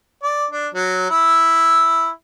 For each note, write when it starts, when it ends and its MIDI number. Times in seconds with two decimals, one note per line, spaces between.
0.23 0.46 74
0.51 0.67 62
0.75 1.10 54
1.10 2.10 64